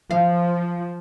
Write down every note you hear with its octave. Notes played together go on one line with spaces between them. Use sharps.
F3 F5